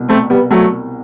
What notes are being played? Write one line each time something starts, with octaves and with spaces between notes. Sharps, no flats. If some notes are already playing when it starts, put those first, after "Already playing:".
Already playing: C2 B2
A3 C4
G3 B3
F#3 A3